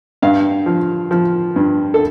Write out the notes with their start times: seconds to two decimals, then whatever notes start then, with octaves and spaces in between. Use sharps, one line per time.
0.22 G2 F5
0.66 F3
1.11 F3
1.56 G2
1.94 A4